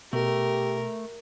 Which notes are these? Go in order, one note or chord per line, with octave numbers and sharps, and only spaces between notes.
B2 A3 G4 A#4